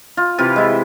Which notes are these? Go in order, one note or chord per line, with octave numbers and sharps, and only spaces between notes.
F4
C3 E3 F4
G#3 E4